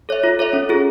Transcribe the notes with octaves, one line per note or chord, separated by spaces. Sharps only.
A4 C#5 E5
F4
A4 C#5 E5
C#4
F4 G#4